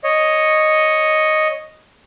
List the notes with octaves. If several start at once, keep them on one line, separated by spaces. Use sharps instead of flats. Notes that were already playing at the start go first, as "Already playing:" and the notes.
C#5 D#5